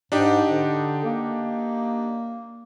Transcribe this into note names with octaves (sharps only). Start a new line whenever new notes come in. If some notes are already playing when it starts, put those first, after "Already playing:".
G#2 D4 D#4 G4
D3
A#3